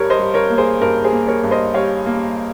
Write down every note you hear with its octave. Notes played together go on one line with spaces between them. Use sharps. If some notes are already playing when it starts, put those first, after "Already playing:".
Already playing: G2 G3 A#4 C#5
C5 D#5
G3
A#4 C#5
A#3
G#4 C5
G2 A#4
G#4 C5
A#3
A#4 C#5
G2
C5 D#5
G3 C#5 F5
A#3